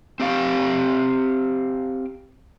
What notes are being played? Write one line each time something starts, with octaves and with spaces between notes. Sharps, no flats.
C4 G4 F5 G5